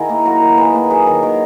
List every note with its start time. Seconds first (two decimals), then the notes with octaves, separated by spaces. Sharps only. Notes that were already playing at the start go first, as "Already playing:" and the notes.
Already playing: D#3 E4 F#4 G#4
0.09 A#3
0.25 F#3 F#4 A#4
0.42 D#3
0.57 D#3 G#4 B4
0.73 A#3
0.90 F#3 G#4 B4
1.07 D#3
1.22 D#3 A#4 C#5